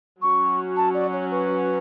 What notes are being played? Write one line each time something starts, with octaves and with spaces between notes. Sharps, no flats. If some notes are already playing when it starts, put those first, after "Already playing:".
F#3 C#4 F#4 C#6
A5
D5
C#5
B4